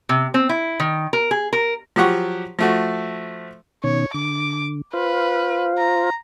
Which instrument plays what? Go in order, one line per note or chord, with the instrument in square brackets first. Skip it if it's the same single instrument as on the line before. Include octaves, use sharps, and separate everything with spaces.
[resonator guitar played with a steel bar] C3
C4
E4
D#3
A#4
G#4
A#4
[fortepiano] F3 F#3 G4 F#5 C#6
F3 A3 F#4
[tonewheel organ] B2 D#3 C#4 [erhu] C#5
[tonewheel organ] D3 [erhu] D6
[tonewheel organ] F4 C5 F5 [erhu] B4
[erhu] A#5